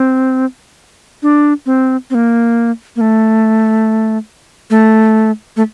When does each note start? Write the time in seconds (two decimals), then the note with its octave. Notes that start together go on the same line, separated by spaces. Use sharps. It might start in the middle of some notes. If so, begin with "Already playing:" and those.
Already playing: C4
1.23 D4
1.66 C4
2.10 C4
2.15 A#3
2.96 A#3
3.01 A3
4.70 A3
5.57 A3